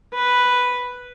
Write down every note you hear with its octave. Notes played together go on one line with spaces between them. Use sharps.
B4